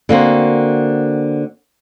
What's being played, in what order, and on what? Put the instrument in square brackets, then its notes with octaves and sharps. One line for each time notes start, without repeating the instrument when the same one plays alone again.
[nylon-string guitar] D3 A#3 C4 F#4